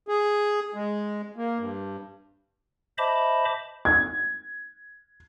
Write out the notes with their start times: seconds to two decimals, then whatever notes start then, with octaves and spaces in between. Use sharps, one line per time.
0.08 G#4
0.74 G#3
1.36 A#3
1.58 G2
2.98 C5 D#5 E5 A5 B5 D6
3.85 G#6